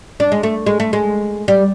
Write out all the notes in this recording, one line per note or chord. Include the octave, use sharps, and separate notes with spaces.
D4
G#3
A3
G#3
A3
G#3
G3